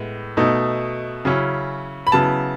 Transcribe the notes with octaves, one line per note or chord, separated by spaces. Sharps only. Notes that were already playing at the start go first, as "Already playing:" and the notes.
Already playing: A2 G#3 B3
B2 A3 D#4
C#3 F#3 C#4 E4
B5
C#3 F#3 B3 E4 A5